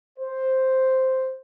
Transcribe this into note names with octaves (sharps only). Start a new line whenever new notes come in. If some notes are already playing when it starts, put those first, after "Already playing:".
C5